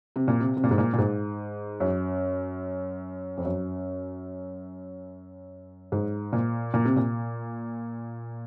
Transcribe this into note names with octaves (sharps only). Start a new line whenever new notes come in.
C3
A#2
C3
C3
A#2
G#2
A#2
A#2
G#2
F#2
F2
F#2
G#2
A#2
A#2
C3
A#2